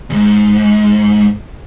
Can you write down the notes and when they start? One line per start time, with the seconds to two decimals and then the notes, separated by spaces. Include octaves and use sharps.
0.10 E2 G#2